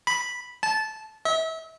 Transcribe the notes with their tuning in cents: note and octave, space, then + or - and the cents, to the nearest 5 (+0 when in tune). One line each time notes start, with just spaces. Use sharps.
B5 -5
A5 -15
E5 -35